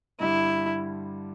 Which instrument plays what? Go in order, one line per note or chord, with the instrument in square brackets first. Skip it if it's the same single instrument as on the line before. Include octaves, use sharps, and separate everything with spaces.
[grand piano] G2 D3 G3 [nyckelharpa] E4